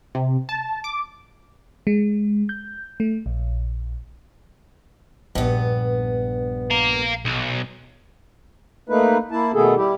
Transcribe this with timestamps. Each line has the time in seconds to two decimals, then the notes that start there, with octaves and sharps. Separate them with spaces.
0.15 C3
0.49 A5
0.84 D6
1.87 G#3
2.49 G6
3.00 A3
3.26 A#1
5.35 A#1 G2 B3
6.71 F5 A#5
7.25 B1
8.89 A3 A#3 D#4 B4
9.31 A#3 E4 A5
9.54 B2 D#3 A3 B3 G#4 A4
9.76 G3 E4 G4